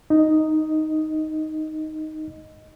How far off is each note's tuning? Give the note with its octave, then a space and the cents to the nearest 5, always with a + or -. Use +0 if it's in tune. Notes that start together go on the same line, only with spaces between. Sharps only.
D#4 +0 D#5 +0